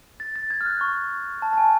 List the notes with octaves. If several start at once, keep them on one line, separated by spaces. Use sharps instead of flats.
A6
A6
G#6
F6
F#6
C#6
A5
A5
G#5